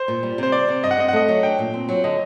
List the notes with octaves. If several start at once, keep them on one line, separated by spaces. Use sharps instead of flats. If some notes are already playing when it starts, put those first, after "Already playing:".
Already playing: C5
A#2
G3
C3 C5
C4 D5
C3
G2 D#5
F#5
C4 D#5
F#5
A3 D#5
F#3
D4 G5
A#2
C4
F#3
D3 D#5